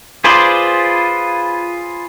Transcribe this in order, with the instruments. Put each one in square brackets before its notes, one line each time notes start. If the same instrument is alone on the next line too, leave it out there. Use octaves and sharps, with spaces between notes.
[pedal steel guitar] F4 G#4 B4 C5 D5